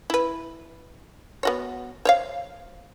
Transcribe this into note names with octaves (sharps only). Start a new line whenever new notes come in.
E4 B4
B3 F#4 C#5
C5 C#5 F5